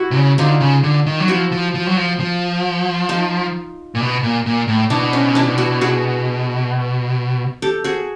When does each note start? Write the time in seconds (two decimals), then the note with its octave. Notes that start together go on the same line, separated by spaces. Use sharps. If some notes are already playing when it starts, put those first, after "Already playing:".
Already playing: E4 F#4
0.11 C3
0.16 C#3
0.38 D3 D#4 F4
0.60 C#3
0.83 D3
1.06 D#3
1.20 F#3
1.28 F3 E4 F#4
1.52 F3
1.74 F3
1.87 F#3
1.97 F3
2.20 F3
3.09 D#4 F4
3.95 A#2
4.00 B2
4.23 A#2
4.46 A#2
4.68 A2
4.90 B2 D4 E4
5.13 C#4 D#4
5.35 D4 E4
5.58 E4 F#4
5.81 F#4 G#4
7.62 G4 A4
7.84 F#4 G#4